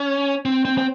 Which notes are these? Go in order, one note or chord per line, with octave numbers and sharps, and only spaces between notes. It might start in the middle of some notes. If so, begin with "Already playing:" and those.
Already playing: C#4
C4
C4
C4